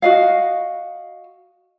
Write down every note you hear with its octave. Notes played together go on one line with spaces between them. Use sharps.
F#4 D#5 F5